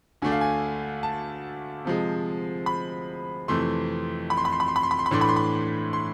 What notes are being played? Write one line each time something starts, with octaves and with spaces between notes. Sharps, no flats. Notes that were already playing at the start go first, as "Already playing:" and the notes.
D2 D3 A3 D4 G#5
F5
G#5
A5
C3 F3 G#3
B5
F2 C3 E3 A3 C6
B5
C6
B5
C6
B5
C6
B5
C6
B5
C6
B5
A2 E3 A3 D4 C6
B5
C6
B5
C6